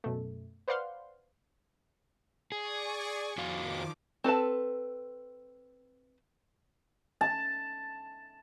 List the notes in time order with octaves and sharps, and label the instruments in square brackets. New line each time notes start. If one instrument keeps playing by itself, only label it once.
[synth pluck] F#2 B2 A3
B4 C5 D5 F5 F#5 C6
[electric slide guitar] G#4 [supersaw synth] D5 G#5 C#6
[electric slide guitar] F2 F#4 F5 [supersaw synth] D#3 F3 D6
[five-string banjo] C4 A4 B4 A5
[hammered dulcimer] A5